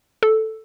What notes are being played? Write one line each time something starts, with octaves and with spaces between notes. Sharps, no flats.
A4